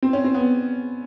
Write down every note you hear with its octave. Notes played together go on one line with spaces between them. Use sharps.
C4
C#4
C4
B3